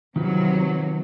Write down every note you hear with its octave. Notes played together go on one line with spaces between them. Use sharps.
C3 D#3 F#3 F4 B4